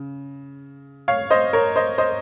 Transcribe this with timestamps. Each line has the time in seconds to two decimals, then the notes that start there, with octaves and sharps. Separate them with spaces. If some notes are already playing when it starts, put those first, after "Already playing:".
Already playing: C#3
1.08 C#5 F5
1.30 C5 D#5
1.53 A#4 C#5
1.76 C5 D#5
1.98 C5 D#5